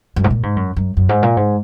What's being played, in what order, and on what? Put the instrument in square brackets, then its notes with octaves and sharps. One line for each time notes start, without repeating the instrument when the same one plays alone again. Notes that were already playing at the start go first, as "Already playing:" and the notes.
[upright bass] F#2
G#2
A#2
G#2
F#2
F#2
F#2
G#2
A#2
G#2